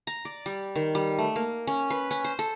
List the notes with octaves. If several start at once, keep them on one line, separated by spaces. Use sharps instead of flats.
A#5
D5
G3
D#3
G3
A3
A#3
C#4
B4
C#4
C5
A4